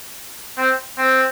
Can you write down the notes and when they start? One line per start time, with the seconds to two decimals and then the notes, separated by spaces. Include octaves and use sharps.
0.58 C4
0.98 C4